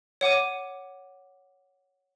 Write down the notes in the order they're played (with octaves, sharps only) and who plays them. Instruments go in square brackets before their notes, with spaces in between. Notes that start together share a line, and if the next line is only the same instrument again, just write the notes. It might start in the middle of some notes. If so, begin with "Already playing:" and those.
[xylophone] C#5 F#5 D6 D#7